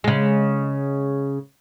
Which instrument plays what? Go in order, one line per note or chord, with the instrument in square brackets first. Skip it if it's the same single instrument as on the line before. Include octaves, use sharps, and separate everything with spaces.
[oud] C#3 G#3